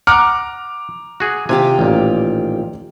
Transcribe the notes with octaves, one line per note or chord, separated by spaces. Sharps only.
F#5 A#5 D6 F6
F#4 G#4
C3 D#3 F4 G4 G#5
A1 A#2